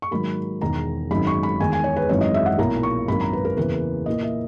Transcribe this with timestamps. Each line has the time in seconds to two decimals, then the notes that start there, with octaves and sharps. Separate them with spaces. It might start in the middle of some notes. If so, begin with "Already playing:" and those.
0.02 C#6
0.11 G#2 D#3 F#3 A#3 B5
0.62 E1 E2 D#3 A#5
1.11 G#1 F#2 D#3 G#3 D#4 B5
1.27 C#6
1.43 B5
1.60 E2 D#3 G#3 G#5
1.73 G#5
1.84 C#5
1.96 B4
2.09 G#1 F#2 E3 G#3 D#4 C#5
2.21 D#5
2.34 E5
2.46 F#5
2.58 B1 A#2 A#3 E4 A#5
2.83 C#6
3.07 G#1 F#2 D#3 A#3 B5
3.21 A#5
3.33 B4
3.45 A#4
3.57 E2 C#3 E3 A#3 B4
4.06 A#2 A#3 E4 D#5
4.23 E5